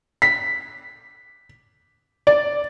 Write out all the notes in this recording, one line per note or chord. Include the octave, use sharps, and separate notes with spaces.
B6
D5